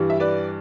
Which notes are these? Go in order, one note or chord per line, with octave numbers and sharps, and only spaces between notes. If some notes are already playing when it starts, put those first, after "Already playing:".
Already playing: G2 E3 G3
E5
B4 D5